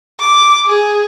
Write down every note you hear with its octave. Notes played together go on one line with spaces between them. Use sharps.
D6
G#4